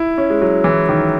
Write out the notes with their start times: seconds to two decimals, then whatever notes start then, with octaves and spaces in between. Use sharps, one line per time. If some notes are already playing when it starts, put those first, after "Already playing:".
Already playing: E4
0.18 C#4
0.30 G#3
0.41 F#3
0.64 E3
0.89 D#3